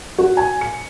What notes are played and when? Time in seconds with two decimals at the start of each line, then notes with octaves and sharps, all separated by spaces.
0.18 F#4
0.37 G#5
0.61 C#7